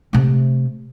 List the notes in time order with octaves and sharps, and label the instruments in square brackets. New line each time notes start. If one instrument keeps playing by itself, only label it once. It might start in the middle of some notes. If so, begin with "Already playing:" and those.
[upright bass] C3 A3